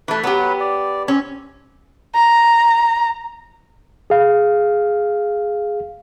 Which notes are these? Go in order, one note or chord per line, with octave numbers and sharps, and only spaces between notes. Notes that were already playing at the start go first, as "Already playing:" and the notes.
E3 A3 B4
F#3 B3 G4 B4 B5
D5
C4 C#4
A#5
G#4 F5